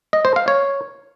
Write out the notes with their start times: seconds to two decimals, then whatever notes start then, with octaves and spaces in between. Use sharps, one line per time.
0.13 D#5
0.25 C5
0.36 F5
0.48 C#5